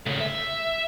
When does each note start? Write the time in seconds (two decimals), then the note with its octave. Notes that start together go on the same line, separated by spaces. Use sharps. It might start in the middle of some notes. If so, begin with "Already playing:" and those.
0.06 C#3 A3
0.21 E5